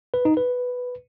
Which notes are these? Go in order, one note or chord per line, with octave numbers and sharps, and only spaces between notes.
B4
D#4
B4